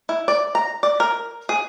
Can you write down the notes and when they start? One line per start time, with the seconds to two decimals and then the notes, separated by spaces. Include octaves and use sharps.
0.09 E4
0.28 D5
0.55 A#5
0.83 D5
1.00 A#4
1.49 G#4